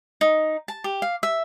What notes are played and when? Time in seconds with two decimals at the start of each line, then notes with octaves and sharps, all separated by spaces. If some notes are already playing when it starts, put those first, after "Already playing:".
0.21 D#4
0.68 A5
0.84 G4
1.02 F5
1.23 E5